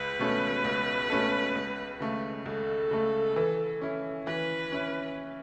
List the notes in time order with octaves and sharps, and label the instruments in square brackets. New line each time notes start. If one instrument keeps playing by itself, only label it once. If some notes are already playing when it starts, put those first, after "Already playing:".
Already playing: [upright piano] C#2 [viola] B4
[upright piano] B2 A3 C#4 A4
C#2
B2 A3 C#4 A4
C#2
C#3 A3
[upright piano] C#2 [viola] A4
[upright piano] C#3 A3
E3
C#4 E4
[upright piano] E3 [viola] B4
[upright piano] C#4 E4